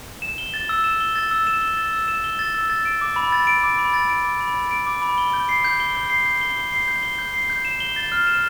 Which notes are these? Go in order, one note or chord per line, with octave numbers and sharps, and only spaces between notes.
E7
G7
A6
E6
E7
G7
A6
E6
E7
G7
A6
E6
E7
G7
A6
E6
A6
D7
D6
B5
A6
D7
D6
B5
A6
D7
D6
B5
A6
D7
D6
B5
G7
G6
C7
G6
G7
G6
C7
G6
G7
G6
C7
G6
G7
G6
C7
G6
E7
G7
A6
F6
E7